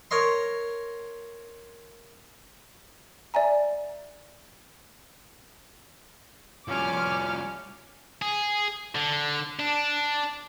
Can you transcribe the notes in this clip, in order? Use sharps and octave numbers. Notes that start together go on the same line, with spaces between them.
A#4 C#5 D#5 C6
D5 E5 G#5 A#5
F3 G3 C#4 D6 F6
G#4
D3
D4